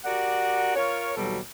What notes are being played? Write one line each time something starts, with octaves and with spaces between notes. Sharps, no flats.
F#4 G4 A#4 D5 F#5
F4 A#4 C#5
D#2 B2 F#3 G3 A4